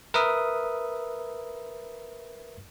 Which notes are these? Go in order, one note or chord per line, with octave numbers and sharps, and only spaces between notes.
A#4 B4 E5 D#6